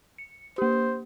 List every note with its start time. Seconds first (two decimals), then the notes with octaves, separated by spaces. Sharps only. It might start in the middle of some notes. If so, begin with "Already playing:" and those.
0.18 C#7
0.58 A#3 G4 C5